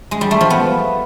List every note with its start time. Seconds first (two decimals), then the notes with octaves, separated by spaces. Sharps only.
0.11 G#3
0.21 G3
0.31 A3
0.41 F3
0.50 B3